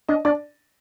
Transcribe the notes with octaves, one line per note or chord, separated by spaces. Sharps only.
D4 D#5
D4 D5